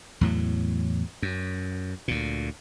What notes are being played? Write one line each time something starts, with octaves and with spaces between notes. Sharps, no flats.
E2 A2 F#3
F#2
D2 A#2